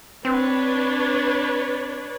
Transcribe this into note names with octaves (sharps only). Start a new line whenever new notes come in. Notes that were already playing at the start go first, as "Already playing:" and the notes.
C4 D4 B4 C#5